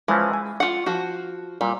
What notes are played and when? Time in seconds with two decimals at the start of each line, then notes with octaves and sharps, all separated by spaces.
0.08 E3 F3 G#3 C#4
0.33 G#5
0.60 F4 F#5
0.86 F3 F#4
1.61 A#2 G3